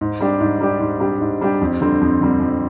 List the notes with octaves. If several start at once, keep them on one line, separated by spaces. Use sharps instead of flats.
G#2
G3 D4 G4
G#2
G3 D4 G4
G#2
G3 D4 G4
G#2
G3 D4 G4
F2
D3 G3 C4
F2
D3 G3 C4
F2